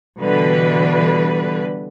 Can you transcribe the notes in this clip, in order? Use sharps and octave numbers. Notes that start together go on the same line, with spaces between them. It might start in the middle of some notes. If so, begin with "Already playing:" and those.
B2 D3 E3 G3 B4